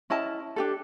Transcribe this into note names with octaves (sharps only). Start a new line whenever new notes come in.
C#4 E4 D#5 A5
D4 G4 A4